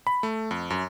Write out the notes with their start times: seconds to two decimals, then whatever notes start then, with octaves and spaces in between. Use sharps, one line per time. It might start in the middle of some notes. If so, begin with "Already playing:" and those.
0.07 B5
0.23 A3
0.51 F2
0.70 F#2